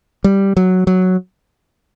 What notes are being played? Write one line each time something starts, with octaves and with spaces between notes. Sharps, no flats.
G3
F#3
F#3